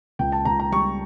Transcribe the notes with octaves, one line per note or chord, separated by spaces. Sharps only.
C#2 G5
A5
C#2 A#5
A#5
G3 C#6